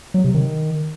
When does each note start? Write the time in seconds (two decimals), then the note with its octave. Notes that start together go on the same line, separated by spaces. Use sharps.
0.14 F#3
0.24 C3
0.34 D#3